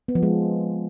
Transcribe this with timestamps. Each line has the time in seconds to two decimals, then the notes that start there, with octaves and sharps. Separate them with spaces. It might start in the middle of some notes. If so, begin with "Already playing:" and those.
0.08 B3
0.15 F3
0.23 G#3